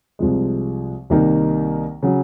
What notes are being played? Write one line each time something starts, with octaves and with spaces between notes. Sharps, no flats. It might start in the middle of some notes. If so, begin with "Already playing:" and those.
C2 C3 F3 G#3
C2 C3 D#3 A#3 D#4
C#3 F#3